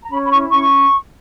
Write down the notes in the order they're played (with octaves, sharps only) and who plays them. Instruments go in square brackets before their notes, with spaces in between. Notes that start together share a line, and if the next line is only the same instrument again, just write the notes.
[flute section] A#5
C#4 B5
B5
E4 C#6
C#4 C#6